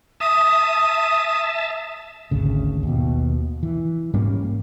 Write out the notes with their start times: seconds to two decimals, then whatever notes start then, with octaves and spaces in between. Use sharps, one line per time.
0.20 E5 A5 D#6
2.31 G#1 D2 C#3
2.83 D#2 B2
3.63 E3
4.14 G#2 G3 A#3 C#4